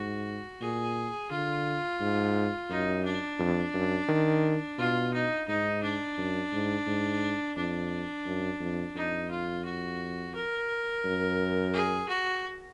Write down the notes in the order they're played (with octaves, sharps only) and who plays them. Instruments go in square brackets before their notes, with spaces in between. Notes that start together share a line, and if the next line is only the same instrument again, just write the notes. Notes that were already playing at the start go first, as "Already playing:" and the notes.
Already playing: [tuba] G#2 [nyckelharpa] F#4
[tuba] A#2 [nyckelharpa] G#4
[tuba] D3 [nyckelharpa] F4
[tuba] G#2
[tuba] F#2 [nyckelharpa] D#4
[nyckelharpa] D4
[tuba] F2
F#2
D#3
[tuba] B2 [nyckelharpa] F4
[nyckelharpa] D#4
[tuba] G#2 [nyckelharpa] D#4
[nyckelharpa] D4
[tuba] F#2
G#2
G#2
[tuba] F2 [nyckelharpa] D4
[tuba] F#2
F2
[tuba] F2 [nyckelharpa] D#4
[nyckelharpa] F4
F#4
A#4
[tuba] F#2
[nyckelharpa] G#4
F#4